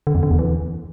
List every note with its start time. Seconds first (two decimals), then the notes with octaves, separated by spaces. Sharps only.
0.07 D3
0.15 F2
0.23 D3
0.31 E2
0.39 E3